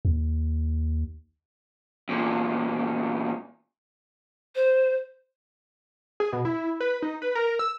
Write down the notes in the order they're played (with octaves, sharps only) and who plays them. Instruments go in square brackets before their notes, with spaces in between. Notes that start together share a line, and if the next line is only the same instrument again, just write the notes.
[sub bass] D#2
[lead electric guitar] E2 A#2
[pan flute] C5
[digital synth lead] G#4
B2
E4
B4
D#4
B4
A#4
E6